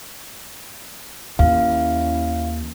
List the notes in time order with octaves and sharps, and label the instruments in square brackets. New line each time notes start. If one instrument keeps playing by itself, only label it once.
[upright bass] D#2 [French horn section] C#4 E4 [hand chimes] F5